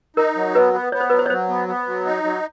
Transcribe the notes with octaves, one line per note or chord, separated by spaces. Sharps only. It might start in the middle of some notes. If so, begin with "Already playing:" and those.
D#4 A#4
F#3
B3 B4
B3
B3 C#5
C5
F#3 B4
C5
C#5
F#3 C5
B3
B3
F#3
D#4
F#3